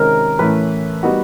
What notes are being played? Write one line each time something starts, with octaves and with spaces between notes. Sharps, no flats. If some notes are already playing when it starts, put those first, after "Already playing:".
Already playing: C3 D#3 G#3 C#4 A#4
A2 E3 A3 C#4 B4
G3 B3 D#4 F#4